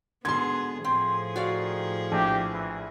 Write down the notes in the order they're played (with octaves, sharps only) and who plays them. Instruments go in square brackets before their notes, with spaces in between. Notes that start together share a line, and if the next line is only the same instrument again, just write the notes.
[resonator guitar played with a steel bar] G#2 B2 D3 [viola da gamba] B3 G#4 [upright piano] C6 G#6
[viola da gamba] A2 F3 G#4 [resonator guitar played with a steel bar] C4
[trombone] D#3 [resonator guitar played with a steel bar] F#4 D5 F5
[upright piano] A#1 [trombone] G4
[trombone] E3